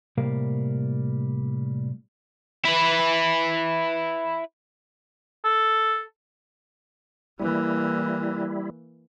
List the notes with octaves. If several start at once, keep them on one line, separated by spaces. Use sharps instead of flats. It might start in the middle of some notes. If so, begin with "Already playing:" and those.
A2 C3 G3 A#3 A#4 F5
E4 B4
A4
E3 G3 A#3 E4